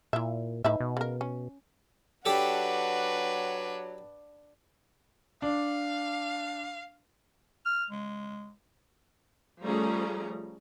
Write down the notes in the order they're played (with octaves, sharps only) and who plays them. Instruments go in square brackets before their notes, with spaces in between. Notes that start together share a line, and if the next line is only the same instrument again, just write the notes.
[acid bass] A#2 [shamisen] E4 E5
[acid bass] A2 [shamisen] D#4 B4 E5
[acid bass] B2
[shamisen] C#3 A#4
C#4
[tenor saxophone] F#3 [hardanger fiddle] D4 B4 [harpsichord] G4 A4 [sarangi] F#5
[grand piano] D4 [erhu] F5
[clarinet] F6
G#3
[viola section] F3 G3 A3 C#4 G#4 A#5